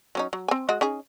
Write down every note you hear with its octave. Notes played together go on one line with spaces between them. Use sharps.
F#3 C#4 D#4
F#3
C4 G#5
G#3 F#4 D#5
C#4 D#4 G#4